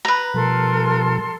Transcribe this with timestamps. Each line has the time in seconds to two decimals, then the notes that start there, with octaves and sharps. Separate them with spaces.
0.05 B4 A#5
0.34 B2 F3 G3 A4 A#4 C6